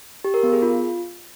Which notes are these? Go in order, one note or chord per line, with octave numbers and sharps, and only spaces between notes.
G4
A#4
B3
G#4
F4